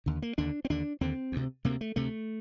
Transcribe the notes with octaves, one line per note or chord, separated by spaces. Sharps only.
D#2 D3
A#3
D#2 D3 D4
C4
D#2 D3 D4
D#2 D3 C4
D2 C3
D2 C3 A#3
A3
D2 C3 A3